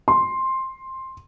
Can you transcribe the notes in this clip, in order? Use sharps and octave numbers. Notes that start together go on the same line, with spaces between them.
C6